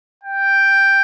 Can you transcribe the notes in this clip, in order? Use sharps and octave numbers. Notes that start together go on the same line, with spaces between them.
G5